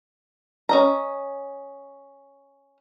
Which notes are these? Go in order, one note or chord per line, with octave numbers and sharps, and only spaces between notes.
C#4 D#5 A#5